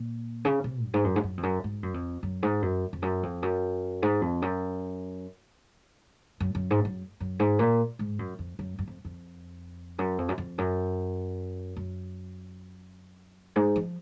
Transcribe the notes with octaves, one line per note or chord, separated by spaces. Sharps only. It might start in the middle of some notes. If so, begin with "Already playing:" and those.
Already playing: A#2
C#3
C3
F#2
G#2
F#2
G#2
F#2
F2
F#2
G#2
F#2
F2
F#2
G#2
F#2
F2
F#2
F2
F#2
G#2
F2
F#2
F#2
F#2
G#2
F#2
F#2
G#2
A#2
G#2
F#2
F2
F#2
F#2
F2
F2
F#2
F2
F#2
F2
F#2
F#2
G#2
F3